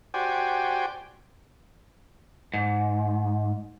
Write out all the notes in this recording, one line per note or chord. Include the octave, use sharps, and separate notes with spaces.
F#4 G4 C5 D5 G5 G#5
G#2